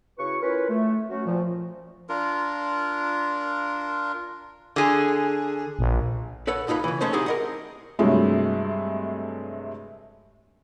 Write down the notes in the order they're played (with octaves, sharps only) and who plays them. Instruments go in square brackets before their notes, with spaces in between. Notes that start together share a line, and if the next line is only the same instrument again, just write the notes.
[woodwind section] C#3 E4 F#4 B4 C#6
C#4 E4 F4 A#4 B4
A3
F#3 A3 C#4 F#4
A#2 F3
[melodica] D4 F4 A#4
[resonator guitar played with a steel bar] D3 G#4
[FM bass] A#1
[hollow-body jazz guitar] A4 B4 C#5 F#5
A2 D#4 F4 B4
C#3 E3
G#3 A3 C#4 A4 C5 C#5
C4 D#4 E4 G4 G#4 F#5
A#4 D#5 F#5
[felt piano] G2 C3 F#3 G#3 A3